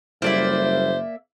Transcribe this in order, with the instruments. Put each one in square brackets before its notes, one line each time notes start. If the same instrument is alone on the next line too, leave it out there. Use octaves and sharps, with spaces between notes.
[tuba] F#1 [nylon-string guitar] G3 A3 E4 [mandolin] A#3 D5 E5 [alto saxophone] C5